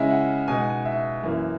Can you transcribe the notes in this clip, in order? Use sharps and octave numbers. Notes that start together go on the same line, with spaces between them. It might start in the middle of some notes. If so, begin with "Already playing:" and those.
Already playing: C#3 G#3 C#4 E4 D#5 E5
F#5
B2 G#3 D#4 G#5
F#5
G#5
E5
F#2 E3 A#3